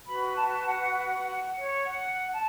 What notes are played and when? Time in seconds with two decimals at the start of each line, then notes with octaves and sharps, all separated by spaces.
0.05 F#4 B4 B5
0.36 A5
0.66 F#5
0.97 F#5
1.27 F#5
1.57 C#5
1.87 F#5
2.32 A5